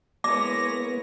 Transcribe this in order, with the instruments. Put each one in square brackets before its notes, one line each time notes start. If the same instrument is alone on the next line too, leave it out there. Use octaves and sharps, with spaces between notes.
[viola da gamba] G#3 E4 C#5 [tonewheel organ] A#3 B3 [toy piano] D6 [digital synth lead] A#6